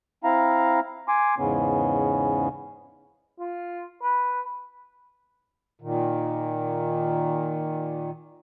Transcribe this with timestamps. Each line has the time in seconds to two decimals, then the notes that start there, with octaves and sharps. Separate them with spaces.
0.24 C4 E4 F5 A#5
1.08 G#5 C6 D6
1.38 E2 G#2 C#3 B3 C#4
3.40 F4
4.03 B4
5.82 A#2 D#3